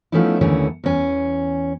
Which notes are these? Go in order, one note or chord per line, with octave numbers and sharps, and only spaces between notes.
F3 A3 B3 C#4 D#4 E4
D#2 D3 E3 A3 C#4
E2 C#4 G#5